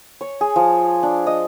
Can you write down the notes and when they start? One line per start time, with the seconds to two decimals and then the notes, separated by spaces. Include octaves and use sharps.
0.21 C#5
0.41 G#4
0.56 F3
1.03 D4
1.27 D#5